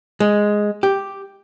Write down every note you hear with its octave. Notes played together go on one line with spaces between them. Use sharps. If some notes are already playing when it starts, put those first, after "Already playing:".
G#3
G4